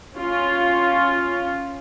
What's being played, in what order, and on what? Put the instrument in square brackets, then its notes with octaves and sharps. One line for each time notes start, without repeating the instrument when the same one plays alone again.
[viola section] C#4 F4